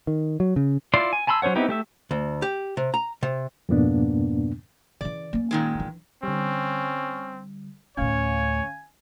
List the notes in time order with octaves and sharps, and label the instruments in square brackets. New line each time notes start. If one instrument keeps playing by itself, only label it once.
[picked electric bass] D#3
F#3
C#3
[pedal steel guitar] E4 F4 D5 C6
G#5
G#5 A5 B5 C6 E6
F#3 C#4 C5 C#5 F#5
B3 C4 D#4 E4 G4
A3 G4 E5
[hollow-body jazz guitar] D2
G4
C3
A#5
C3
[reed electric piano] F2 G#2 B2 A#3 B3 D4
[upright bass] C#3 E3 [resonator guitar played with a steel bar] D5
[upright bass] A#3 C#4
[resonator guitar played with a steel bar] A#2 D#3 G#3
[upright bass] E3 D4
[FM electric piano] D3 G3 [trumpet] C4 [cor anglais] C#4
[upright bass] D2 A2 [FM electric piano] C#4 F5 [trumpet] C#5 [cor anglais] G#5